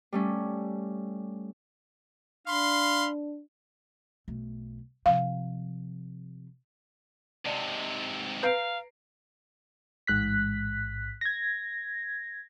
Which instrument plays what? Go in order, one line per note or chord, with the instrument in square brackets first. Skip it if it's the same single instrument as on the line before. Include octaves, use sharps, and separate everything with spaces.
[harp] G3 A3 C#4
[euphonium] D4 [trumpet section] F5 B5 C6
[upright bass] B1 A3
[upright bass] C3 F3 [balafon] F5
[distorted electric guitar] G#2 C3 [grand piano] D5 D#5 A5
[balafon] B4 [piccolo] F5 [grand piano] A#5 C7 D7
[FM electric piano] A1 G#2 F#6 B6
G#6 A#6